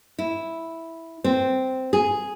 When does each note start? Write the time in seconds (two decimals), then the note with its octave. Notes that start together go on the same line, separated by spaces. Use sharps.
0.19 E4
1.24 C4
1.93 G#4